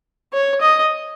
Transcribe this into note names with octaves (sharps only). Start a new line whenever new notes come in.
C#5
D#5